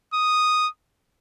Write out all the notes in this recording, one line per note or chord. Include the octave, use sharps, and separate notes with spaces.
D#6